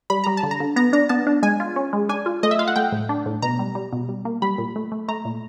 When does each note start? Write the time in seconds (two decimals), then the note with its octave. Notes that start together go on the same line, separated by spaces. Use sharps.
0.10 G3 B5
0.24 G3 A#5
0.37 A5
0.43 D3
0.51 A#5
0.60 D3
0.76 B3 A#5
0.93 D4 A#5
1.09 B3 A5
1.27 D4
1.43 G#3 G#5
1.60 F4
1.76 C#4
1.93 G#3
2.09 D4 G#5
2.26 F4
2.43 A3 D#5
2.51 E5
2.59 F4 F5
2.68 F#5
2.76 A3 G5
2.92 A2
3.09 D4
3.26 A2
3.42 B2 A#5
3.59 G3
3.75 G3
3.93 B2
4.09 G3
4.25 A#3
4.42 G3 B5
4.58 A#2
4.76 A3
4.92 A3
5.08 A3 A#5
5.25 A#2